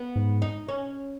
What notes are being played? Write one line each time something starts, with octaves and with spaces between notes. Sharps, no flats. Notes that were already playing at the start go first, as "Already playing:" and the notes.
Already playing: B3
G#2
D#4
C#4